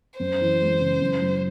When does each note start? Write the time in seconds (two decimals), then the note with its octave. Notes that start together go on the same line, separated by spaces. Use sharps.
0.20 F#2 C5
0.41 E3
0.61 G#3
0.80 C#3
1.01 F#2
1.21 F#3